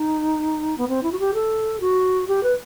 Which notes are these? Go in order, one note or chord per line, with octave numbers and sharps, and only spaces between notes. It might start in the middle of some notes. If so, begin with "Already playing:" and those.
Already playing: D#4
B3
C4
E4
F#4
G4
A4
F#4
G4
B4